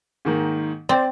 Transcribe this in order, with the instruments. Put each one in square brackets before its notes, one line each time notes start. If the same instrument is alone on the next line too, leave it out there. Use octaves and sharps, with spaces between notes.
[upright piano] G#2 D#3 A#3
[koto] C4 [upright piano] C5 D5